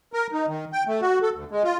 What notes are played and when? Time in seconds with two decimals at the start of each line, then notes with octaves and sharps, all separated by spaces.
0.13 A#4
0.33 D#4
0.47 D#3
0.73 G5
0.87 A3
1.02 F#4
1.22 A4
1.34 D2
1.51 G#3
1.64 F4